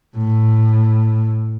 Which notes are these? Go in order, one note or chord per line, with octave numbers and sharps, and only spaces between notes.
A2